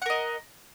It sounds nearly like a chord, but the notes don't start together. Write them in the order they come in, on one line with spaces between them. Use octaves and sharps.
F#5 A#4 D#5